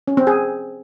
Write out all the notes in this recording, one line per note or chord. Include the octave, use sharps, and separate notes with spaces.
C#4
C4
G#4